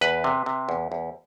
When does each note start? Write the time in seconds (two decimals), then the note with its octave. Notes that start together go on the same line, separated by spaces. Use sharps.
0.01 E2 B4
0.24 C3
0.46 C3
0.69 E2
0.92 E2